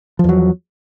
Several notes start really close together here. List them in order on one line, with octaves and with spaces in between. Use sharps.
F3 E2 F#3